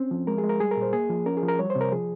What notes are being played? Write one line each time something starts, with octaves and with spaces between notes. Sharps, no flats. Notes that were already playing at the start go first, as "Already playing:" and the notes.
Already playing: C4 C#4
F3
G#3 A#4
G#4
G#3
A#4
G3 G#4
A#4
A#2
C5
A#3 G#4
F3
C#4 A#4
G#4
F3
A#4
G3 C#5
C5
C3
A#4
F3 G#4